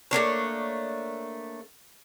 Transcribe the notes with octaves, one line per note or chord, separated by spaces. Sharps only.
A3 A#3 D4 C#5